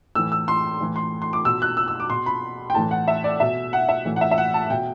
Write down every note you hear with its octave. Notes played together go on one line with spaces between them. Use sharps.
A2 E3 E6
E6
C6
A2 E3
C6
C6
D6
B2 E6
F#6
E6
E6
D6
B2 C6
B5
G5
A2 E3 A5
F#5
E5
D5
B2 E5
F#5
E5
A2 E3
F#5
E5
E5
F#5
A5
B2 G5